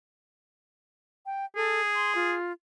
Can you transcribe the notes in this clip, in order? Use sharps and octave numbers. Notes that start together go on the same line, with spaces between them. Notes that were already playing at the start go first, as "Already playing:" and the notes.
G5
G#4 A4
C6
F4